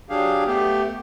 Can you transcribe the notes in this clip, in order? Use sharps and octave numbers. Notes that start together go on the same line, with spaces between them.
F#3 D4 G4 G#4 F5
A3 B3 G4